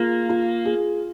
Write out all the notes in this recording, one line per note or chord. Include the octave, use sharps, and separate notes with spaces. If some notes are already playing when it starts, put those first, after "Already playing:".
Already playing: A#3 F4 G#4
F4
G#4